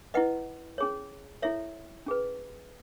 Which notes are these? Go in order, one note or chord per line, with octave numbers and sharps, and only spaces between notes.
E4 B4 D#5 F#5
C#4 G#4 C#5
E4 A4 C#5 E5
C#4 G#4 B4